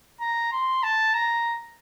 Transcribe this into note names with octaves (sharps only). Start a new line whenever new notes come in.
A#5
C6
A5
A#5